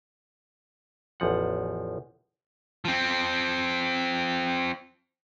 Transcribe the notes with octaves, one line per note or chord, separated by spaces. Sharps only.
A1 E2 F3 F#5
F3 C4